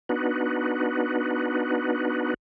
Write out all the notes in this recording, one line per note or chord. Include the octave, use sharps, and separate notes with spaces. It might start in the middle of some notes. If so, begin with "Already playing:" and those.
B3 D4 D#4 F#4 B4